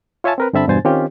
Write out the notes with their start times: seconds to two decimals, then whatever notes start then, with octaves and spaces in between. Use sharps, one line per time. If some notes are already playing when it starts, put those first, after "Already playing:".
0.24 F4 C#5 E5 G#5 A5
0.38 C4 A#4 B4
0.53 G2 D3 C4 E5 A5 B5
0.67 E2 G2 B2 C5 G#5 A6
0.85 D#3 C4 C#4 F4 G4